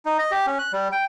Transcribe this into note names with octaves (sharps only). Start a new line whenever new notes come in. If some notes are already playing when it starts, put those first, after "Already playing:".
D#4
D#5
G4
C#4
F#6
G3
G5